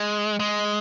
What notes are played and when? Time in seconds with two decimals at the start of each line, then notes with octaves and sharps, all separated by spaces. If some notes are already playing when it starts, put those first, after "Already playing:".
Already playing: G#3
0.40 G#3